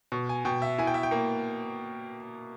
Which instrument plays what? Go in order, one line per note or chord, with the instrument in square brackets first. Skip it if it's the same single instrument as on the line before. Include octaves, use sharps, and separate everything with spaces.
[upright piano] B2
[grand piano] G#5
[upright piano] B2 [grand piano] G5
[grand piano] E5
[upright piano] E4 [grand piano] G#5
[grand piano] G5
E5
G5
[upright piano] A#3